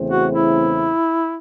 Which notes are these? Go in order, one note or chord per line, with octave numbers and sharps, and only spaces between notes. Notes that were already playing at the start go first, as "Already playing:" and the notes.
Already playing: E2 C#3 E3 A3 C4
F#4
E4